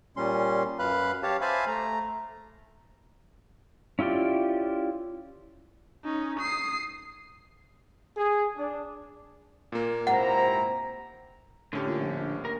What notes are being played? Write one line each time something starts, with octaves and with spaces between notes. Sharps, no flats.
A#2 G3 C#4 C6
F#2 B4 F5 B5 F#6
G4 C#5 F5 A5
C5 E5 F5 G#5 A5 B5
A3 A#5
C#4 E4 F4 G4 D5
C#4 D#4
D#6 C7
G#4
D4
A#2 A#3
G#2 C3 C4 E4 F#5 A#5
A2 D3 C#4 G4
A#2
A#1
A#4